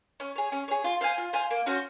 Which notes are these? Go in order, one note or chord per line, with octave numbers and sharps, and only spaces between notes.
C#4
G#4 C#5
C#4
G#4 C#5
F4
C5 F5 G#5
F4
C5 F5 G#5
A#3
C#4 F#4 C5